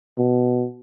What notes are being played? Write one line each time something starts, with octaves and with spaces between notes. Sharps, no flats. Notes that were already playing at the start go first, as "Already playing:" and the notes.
B2